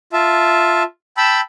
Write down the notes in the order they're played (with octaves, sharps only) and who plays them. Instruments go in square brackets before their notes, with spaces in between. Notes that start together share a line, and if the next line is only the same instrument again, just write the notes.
[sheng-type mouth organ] F4 E5 A5
G5 A5 B5 E6